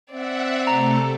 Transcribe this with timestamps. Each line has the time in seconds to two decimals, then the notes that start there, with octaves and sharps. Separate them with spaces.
0.11 C4 D5 E5 F#5
0.67 C3 A3 A4 A#5